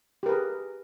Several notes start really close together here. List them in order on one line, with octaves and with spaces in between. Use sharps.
G4 A#4 B4 G#4